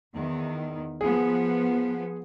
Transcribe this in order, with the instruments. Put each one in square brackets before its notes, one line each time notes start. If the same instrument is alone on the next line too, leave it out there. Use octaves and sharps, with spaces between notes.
[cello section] E2 D#3
[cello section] F3 B3 [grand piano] G#4